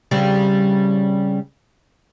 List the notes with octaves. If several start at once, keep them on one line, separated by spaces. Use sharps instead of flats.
C#3 G3 C4